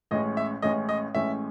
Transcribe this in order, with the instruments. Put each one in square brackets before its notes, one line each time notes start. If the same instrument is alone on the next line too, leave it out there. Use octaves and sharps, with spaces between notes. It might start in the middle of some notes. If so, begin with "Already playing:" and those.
[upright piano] A1 A2 G#3 C#4 [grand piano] D#5
[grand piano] E5
[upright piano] A1 A2 G#3 C#4 [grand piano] D#5
[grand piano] D#5
[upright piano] A1 A2 G#3 C#4 [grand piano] E5